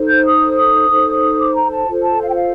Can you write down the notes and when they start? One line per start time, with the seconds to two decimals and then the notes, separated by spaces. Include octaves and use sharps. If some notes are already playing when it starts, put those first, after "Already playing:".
Already playing: D#4 A4 C5
0.09 G6
0.25 D#6
0.90 D#4 A4 C5
1.39 D6
1.55 A#5
1.72 A5
1.87 F4 A4 C5
2.03 A5
2.21 F5
2.28 G5
2.35 F5